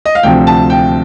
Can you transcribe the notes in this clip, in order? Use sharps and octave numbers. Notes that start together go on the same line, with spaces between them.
D#5
F5
D2 C3 F3 G5
A5
G5